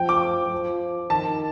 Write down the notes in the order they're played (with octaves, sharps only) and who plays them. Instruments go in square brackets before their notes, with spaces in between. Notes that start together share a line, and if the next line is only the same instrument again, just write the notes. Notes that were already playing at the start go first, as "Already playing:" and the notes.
Already playing: [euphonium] F3 [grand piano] G5
[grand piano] D6
[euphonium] F3
[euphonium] D#3 [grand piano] A5